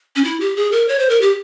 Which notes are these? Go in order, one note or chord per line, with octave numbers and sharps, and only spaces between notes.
C#4
E4
G4
G#4
A#4
C#5
C5
A#4
G4